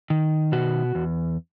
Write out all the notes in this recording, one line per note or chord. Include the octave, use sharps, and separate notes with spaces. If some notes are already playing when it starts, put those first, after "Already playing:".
D#3
B2 F#4
E2